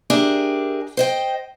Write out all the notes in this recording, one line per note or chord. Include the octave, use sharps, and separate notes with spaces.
D4 G4 G#4 A#4 E5
C5 D#5 G5